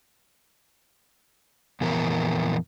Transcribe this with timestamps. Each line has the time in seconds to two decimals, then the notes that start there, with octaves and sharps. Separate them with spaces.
1.81 F2 A#2 E3 B3 A#4